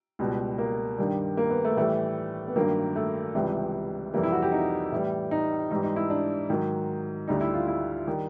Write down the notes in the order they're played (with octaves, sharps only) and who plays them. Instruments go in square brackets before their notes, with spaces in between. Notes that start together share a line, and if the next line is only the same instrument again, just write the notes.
[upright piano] C#2 B2 G3
A#3
G2 D#3 G3
A#3
B3
A3
A2 E3 G3 A3
B3
G2 D#3 F#3 A#3
A3
C#2 C3 E3 G3
F2 C3 E3 G3 A#3
E4
F#4
G4
D#4
A2 E3 G3
D#4
G#2 E3 G3 D#4
D#4
E4
D4
G#2 D#3 F#3
D2 D3 G3 D#4
E4
F4
E4
D#3 G3